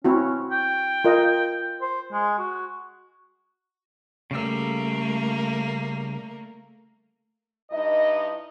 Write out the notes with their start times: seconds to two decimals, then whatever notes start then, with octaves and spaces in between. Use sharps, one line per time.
0.05 C4 C#4 E4 F#4
0.51 G5
1.05 F4 A#4 D#5
1.82 C5
2.12 G#3
2.39 F#4
4.31 C#3 G3 A3 A#3 E6
7.71 G2 D#4 E4 D#5